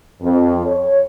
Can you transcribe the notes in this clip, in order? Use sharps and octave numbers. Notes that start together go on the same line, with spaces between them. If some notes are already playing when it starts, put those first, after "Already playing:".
F2
C#5